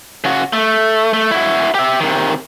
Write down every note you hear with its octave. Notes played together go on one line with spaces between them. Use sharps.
C#3 F#4
A3
A3
E4 F#4
G4 E5
C3 D#3